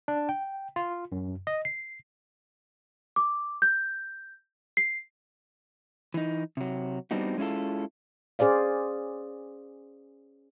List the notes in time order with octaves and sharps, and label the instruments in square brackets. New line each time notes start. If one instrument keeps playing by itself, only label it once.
[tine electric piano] D4
G5
F4
F#2
D#5
C7
[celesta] D6
G6
C7
[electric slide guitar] E3 D#4
C3 F#3
G3 B3 C4 D4 D#4 F#4
G#3 C#4 E4 F4 A4
[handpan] C#4 G#4 C5 D5 F5